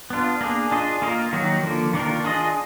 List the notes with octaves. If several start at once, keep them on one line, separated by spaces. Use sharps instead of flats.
B3 D4 F4
A#3 D4 G#4
D4 F4 G#4 D#5
A#3 F4 A#4 D#5
D#3 F#3 A#3 D#4 F#4
D3 F3 A#3
D#3 A#3 D4 F4 A#4
D4 F4 G#4 D#5